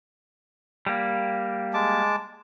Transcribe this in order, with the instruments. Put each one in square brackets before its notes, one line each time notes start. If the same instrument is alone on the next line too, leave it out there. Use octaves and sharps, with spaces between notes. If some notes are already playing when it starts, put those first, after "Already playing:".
[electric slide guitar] G3 A#3
[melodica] G#3 A5 D6